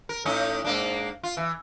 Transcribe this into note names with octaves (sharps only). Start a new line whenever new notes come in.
A#4
A2 C#4 D#4
G#2 A#3 D4
F4
E3